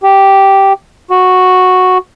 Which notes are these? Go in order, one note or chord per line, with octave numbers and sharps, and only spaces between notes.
G4
F#4